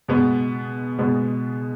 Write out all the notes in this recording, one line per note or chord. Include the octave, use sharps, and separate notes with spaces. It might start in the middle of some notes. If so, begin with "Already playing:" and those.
B2 G#3 B3
B2 G#3 B3